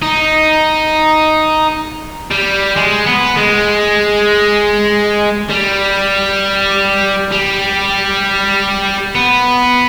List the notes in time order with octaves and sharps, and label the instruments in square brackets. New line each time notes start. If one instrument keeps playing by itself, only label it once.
[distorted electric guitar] D#4
G3
G#3
B3
G#3
G3
G3
B3